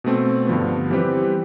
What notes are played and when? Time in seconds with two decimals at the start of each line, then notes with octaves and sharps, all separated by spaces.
0.04 B2 A3 C4
0.47 G2 D3 F3 B3
0.90 E3 G3 C4 G4 B4